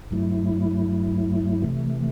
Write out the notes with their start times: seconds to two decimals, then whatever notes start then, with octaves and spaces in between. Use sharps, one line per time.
0.11 G2 F#3 A3 E4
1.62 C3 E3 A3